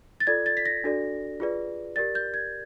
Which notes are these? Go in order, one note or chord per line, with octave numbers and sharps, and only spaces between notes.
A6
F4 A4 D5 G#6
A6
B6
A#6
D4 F#4 A4 D5
F4 G#4 B4 D5
G4 A#4 D5 A6
G6
G#6